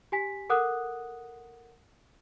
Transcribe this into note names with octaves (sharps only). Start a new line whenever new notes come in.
G4 G#5 B6
A4 A#4 F#5 D#6 F#6